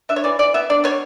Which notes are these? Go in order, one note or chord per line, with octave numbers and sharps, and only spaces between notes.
D4 E5
C#5
E3 D5
E3 D5
B3 E5
D4 D5
B2 C#5